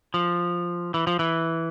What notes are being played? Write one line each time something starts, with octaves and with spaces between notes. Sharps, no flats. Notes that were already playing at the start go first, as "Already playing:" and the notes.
F3
E3
F3
E3